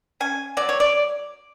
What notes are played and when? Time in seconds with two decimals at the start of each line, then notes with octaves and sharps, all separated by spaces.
0.20 C#4 G#5
0.57 F#3 D5
0.69 C#5
0.80 D5